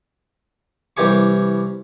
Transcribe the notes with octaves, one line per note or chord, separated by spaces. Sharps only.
C2 E3 G4 G#5 C#6